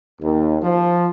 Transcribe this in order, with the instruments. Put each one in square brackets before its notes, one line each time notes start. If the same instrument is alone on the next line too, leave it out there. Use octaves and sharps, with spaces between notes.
[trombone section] D#2
F3